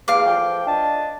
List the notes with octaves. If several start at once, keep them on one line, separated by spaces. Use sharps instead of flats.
E2 F5 D6
F3 A3 G5
D4 D#5 A5